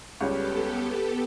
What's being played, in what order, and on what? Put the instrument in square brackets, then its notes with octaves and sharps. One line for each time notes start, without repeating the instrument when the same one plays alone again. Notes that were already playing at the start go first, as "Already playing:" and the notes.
[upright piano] C#2 G3 C#4 [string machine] B3 G4 A4